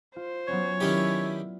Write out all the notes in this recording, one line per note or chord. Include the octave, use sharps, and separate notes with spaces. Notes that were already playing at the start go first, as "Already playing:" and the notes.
F4 C5
F#3 B3 C#4 C#5
D#3 C#4 E4 G4 D5 F6 G#6